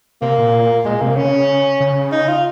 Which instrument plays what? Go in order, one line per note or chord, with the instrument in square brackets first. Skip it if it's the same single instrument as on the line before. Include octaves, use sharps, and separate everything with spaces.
[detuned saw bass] C3 [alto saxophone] A#3
[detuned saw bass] A#2
[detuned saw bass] A#2 [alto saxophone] G#3
[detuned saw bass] C3 [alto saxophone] A#3
[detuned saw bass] C#3 [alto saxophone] C#4
[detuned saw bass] C#3
[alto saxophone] D#4
F4